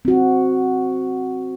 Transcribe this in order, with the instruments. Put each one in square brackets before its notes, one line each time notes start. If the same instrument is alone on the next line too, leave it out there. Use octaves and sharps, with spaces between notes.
[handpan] C4 F#4